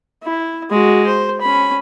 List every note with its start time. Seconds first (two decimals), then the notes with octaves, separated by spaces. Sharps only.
0.23 E4
0.70 G#3 F#4
1.07 C5
1.41 C#4 B5